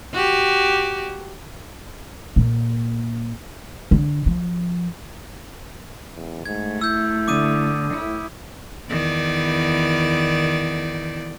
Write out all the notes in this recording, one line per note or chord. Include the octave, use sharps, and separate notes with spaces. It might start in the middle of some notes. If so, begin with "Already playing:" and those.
F#4 G4
A#2
D3
F3
E2
G#2 A3 G#6
E4 E6 G6
D3 D6 D#6 D#7
A2 E4
E2 D#3 D5